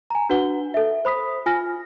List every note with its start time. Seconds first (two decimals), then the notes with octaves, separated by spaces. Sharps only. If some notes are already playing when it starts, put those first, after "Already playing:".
0.10 G#5 A#5
0.30 D4 F#4 B4 F#5 G7
0.74 A4 E5
1.05 C5 B5 D#6 B6
1.46 F4 G#5 F6 A#6